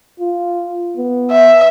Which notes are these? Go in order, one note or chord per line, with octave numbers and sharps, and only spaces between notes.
F4
B3
E5